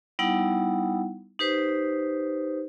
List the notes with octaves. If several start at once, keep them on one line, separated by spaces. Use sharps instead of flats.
G3 B3 D#4 E4 F#5
D#4 G4 B4 C5